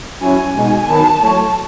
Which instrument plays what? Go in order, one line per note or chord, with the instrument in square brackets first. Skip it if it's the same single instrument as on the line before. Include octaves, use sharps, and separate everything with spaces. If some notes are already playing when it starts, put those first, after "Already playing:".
[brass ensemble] F#3 C#4 E4 [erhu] G#5
[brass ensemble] B2 G#3 D#4 F#4
[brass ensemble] D#3 F#3 B3 [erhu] A5
[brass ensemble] F#3 A3 E4 A4 C#5 [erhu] A5